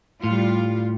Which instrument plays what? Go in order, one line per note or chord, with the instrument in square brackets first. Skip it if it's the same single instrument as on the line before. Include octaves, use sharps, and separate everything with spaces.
[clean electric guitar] A2 [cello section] G3 F4